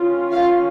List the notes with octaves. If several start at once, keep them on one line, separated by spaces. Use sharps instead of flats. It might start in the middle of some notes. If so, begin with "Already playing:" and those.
Already playing: D#3 C#4 F4
F4 F5